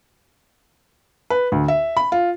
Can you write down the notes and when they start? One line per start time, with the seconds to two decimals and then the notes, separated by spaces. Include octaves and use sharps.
1.30 B4
1.52 D2
1.68 E5
1.97 B5
2.12 F4